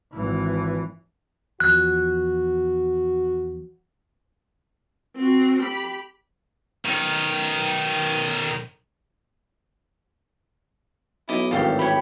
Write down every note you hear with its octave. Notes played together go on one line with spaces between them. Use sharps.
G#1 E3
E2 F3 F#4 F#6
C4 F#4
G4 B5
B1 D#3
B1 E4 D#5 D6
G#1 F#2 A2 E3 G4 A4 F5
G4 C#5 B5